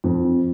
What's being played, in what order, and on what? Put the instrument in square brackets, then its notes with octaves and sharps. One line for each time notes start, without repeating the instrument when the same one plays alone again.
[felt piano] F2